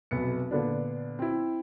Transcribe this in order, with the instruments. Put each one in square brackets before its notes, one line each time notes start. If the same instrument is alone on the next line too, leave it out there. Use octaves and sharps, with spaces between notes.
[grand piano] F1 B1 B3 C#7
A#2 D3 B3 D4
C4 E4